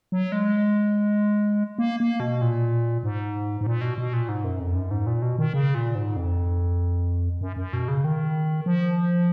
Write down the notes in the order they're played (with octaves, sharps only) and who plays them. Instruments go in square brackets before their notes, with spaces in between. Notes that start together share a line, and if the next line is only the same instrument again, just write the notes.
[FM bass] F#3
G#3
A#3
A#3
B2
A#2
G#2
G#2
A#2
B2
B2
A#2
G#2
F#2
F2
F#2
G#2
A#2
B2
D#3
C#3
A#2
G#2
F2
F#2
F#2
B2
C#3
D#3
F3